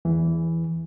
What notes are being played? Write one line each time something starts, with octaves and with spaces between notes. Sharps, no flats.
E2 E3